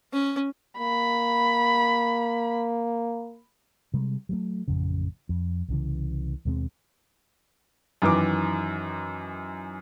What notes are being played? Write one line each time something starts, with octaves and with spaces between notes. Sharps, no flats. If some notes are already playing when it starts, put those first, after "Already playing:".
C#4
A#3 B5
C3 G3 G#3
F#3 G3 A3
A1 F2 C#3
F2
C2 C#3 E3
D#2 B2 G#3 C4
F#2 D#3 E3 D6